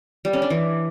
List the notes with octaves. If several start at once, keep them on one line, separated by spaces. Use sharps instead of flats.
G3
C#4
D4
E3